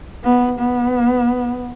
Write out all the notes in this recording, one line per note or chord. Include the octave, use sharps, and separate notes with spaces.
B3
B3